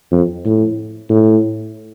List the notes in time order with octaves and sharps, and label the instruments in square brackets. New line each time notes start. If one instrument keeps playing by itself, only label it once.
[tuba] F2
A2
A2